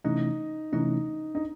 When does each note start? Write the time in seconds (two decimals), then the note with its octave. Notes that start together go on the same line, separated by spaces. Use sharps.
0.04 C3 E3 A3 C#4 D#4 E4
0.73 C3 E3 A3 C#4 D#4 E4
1.35 D#4